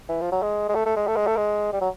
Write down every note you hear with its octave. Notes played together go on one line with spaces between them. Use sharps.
E3
F3
F#3
G#3
G#3
A3
A3
G#3
A3
G#3
A3
G#3
G3
F#3